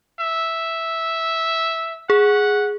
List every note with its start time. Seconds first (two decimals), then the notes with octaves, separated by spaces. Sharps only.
0.20 E5
2.10 G#4 F#5